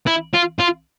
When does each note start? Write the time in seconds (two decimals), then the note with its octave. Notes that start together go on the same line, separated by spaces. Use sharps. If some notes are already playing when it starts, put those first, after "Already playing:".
0.07 E4
0.34 F4
0.59 F4